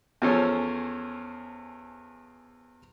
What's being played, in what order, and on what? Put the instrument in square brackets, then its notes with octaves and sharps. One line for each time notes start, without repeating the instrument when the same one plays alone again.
[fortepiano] E2 F3 C#4 A4 C5 C#5